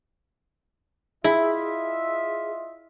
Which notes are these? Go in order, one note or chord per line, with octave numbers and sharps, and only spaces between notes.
E4 F4 G#4 D#5 E5